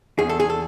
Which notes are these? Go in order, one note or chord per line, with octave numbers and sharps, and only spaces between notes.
E2 G#4
A4
G#4
A4